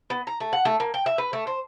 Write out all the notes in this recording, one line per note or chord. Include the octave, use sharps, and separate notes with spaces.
B3
A#5
A3
F#5
A3
A#3
G5
E5
B4
A3
C5